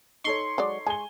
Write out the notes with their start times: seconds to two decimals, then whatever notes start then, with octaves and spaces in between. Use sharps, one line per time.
0.24 D#4 A4 C#5 C6 C#6
0.58 F#3 G#3 D5
0.86 G#3 G#5 G7